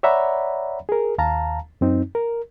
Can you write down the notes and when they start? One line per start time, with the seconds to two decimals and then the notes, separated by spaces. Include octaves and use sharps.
0.03 C#5 D5 E5 F#5 A#5 B5
0.89 G#4 A#4
1.18 D#2 F5 A5 A#5
1.81 F#2 C4 D#4
2.15 A#4